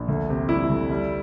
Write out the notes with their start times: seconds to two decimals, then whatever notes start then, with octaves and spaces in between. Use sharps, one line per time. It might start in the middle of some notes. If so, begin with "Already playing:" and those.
Already playing: A#1
0.08 D2
0.29 C3
0.49 G3 E4
0.70 D2
0.91 G3